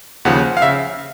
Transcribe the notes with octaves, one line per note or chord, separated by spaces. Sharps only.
D#2 C#3 F3 F#5
F5
C#3 E5